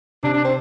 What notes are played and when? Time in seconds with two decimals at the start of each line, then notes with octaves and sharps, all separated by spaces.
0.23 C3 D4
0.33 D4
0.45 C4